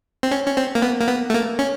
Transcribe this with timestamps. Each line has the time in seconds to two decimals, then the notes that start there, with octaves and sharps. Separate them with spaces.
0.23 C4
0.32 C#4
0.46 C#4
0.57 C4
0.75 A#3
0.82 B3
1.01 A#3
1.08 B3
1.30 A3
1.34 A#3
1.59 C#4